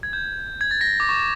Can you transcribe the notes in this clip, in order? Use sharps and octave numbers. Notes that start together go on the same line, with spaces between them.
G#6
G6
G#6
A6
A#6
D6
C#6